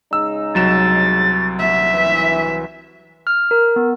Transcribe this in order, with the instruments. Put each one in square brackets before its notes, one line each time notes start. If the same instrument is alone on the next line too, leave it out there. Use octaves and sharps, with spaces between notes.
[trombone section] C#3 G#3 D#4 [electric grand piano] E6
[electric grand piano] C2 F#3 E7 [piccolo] A6
[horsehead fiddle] E5
[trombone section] E3 [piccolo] B6
[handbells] F6
A#4
B3